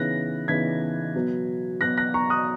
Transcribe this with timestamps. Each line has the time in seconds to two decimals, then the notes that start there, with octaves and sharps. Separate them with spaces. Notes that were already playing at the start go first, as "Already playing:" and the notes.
Already playing: C#3 E3 B3 D#4 F#6 A#6
0.48 C#3 E3 B3 D#4 G#6 B6
1.15 B2 F#3 B3
1.81 B2 F#3 B3 F#6 A#6
1.97 F#6 A#6
2.14 A#5 C#6
2.30 D#6 F#6